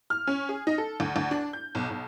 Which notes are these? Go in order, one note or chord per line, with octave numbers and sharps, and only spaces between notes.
F6
C#4
G#4
D#4
A4
D2
D2
D4
G6
B1
B1